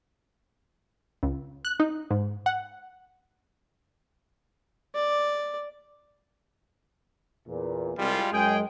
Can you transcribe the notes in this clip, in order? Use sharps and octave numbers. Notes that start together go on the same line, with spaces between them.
C#2
F#6
D#4
G#2
F#5
D5
E2 A#2
C2 G3 G#3 F4
F#2 G#3 G#4 G5